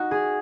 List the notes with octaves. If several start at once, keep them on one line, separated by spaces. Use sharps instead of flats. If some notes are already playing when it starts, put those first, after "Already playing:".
Already playing: D#4 F#4
G#4